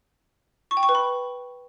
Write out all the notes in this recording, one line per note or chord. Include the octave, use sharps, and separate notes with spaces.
C#6
G5
C#6
B4
B5